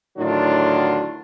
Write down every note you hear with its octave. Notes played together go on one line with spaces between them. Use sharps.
A2 D3 D#3 F#3 D4 F4